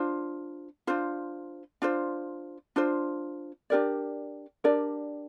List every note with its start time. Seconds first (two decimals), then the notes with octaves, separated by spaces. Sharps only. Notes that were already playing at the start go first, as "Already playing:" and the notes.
Already playing: D4 F4 C5
0.87 D4 F4 C5
1.82 D4 F4 C5
2.76 D4 F4 C5
3.70 D4 G4 A#4 D5
4.64 D4 G4 A#4 D5